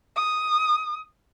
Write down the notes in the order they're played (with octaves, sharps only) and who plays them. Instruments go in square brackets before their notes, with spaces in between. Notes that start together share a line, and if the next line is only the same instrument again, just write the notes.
[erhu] D#6